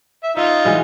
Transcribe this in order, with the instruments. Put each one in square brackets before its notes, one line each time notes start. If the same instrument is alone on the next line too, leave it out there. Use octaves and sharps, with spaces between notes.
[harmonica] E5
[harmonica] D#4 F4 [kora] E5
[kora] B2 E3 G#3